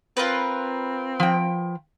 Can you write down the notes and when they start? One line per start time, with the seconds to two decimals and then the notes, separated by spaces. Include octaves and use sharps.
0.17 C4 F4 A#4 B4
1.20 F3 G5